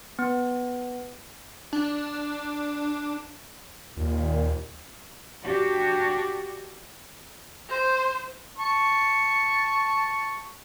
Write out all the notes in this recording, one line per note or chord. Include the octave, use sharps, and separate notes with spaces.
B3
D4
D#2 A#2
D4 F#4 G4
C5
A5 C#6